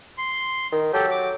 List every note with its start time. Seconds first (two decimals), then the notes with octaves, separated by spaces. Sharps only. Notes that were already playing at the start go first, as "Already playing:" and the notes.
0.18 C6
0.72 D#3
0.93 F#3 G4 A4 G5
1.11 D6